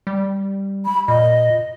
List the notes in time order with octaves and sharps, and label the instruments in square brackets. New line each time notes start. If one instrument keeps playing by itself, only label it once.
[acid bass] G3
[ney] B5
[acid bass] A#2 [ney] D#5